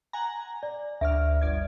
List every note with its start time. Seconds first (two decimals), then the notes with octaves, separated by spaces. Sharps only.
0.13 F#5 G#5 A#5
0.63 D5
1.01 D2 D5 E5 F6
1.41 G1 D5 G#6